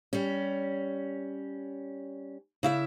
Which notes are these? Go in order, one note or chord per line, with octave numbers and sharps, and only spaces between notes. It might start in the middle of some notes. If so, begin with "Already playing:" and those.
G3 C#4
C#3 E4 E5